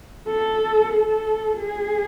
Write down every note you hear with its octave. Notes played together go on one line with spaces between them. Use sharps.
A4
A4
G#4